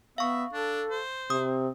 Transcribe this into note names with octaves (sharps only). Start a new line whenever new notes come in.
B3 E5 F5 C#6
D4 A4
C5
C3 C4 D#6